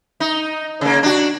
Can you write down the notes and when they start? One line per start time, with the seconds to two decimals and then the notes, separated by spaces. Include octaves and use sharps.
0.20 D#4
0.81 C#3 A#3
1.03 D4 F#4